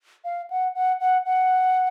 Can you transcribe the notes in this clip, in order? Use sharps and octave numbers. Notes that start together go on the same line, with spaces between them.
F5
F#5
F#5
F#5
F#5